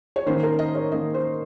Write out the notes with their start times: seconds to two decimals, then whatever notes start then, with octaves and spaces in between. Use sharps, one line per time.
0.16 C#5
0.26 D#3 A#3 C#4 C5
0.43 A#4
0.59 D#5
0.75 C#5
0.92 D#3 A#3 C#4 D#5
1.14 C5